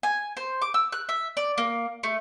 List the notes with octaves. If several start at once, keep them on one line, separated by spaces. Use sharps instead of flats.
G#5
C5
D6
E6
F#6
E5
D5
A#3
A3